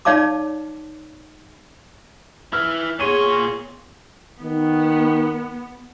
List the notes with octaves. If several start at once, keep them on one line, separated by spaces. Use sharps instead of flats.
D#4 C#5 D5 F5 A5 D6
E4 B4 F6
A#2 B3 G#4 C#5 C6 D#7
D#3 B3